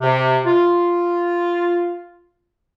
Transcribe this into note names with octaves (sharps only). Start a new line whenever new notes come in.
C3
F4